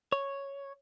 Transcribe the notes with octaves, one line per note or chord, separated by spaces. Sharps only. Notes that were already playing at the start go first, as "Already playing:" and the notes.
C#5